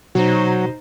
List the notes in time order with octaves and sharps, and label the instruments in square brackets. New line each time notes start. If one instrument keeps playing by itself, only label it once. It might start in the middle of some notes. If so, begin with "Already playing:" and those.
[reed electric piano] B2 F#4 [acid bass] F#3 [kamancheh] D#4 C5